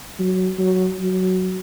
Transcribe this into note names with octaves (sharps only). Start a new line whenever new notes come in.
F#3
F#3
F#3